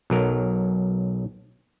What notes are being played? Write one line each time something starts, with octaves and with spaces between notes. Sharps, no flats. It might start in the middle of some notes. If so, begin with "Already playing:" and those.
B1 F#3 A#4